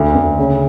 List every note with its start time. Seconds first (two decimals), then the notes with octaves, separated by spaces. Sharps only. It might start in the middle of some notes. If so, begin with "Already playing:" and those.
Already playing: D2 D3
0.15 D2
0.38 C#3